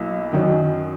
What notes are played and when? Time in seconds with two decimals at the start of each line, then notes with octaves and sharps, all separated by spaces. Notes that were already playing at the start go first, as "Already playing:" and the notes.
Already playing: B1 F#3 A#3 E4
0.33 F#2 D#3 F#3 C#4